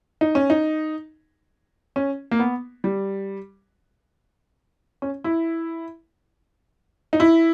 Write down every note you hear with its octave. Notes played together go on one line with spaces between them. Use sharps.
D#4
C#4
D#4
C#4
A#3
B3
G3
C#4
E4
D#4
E4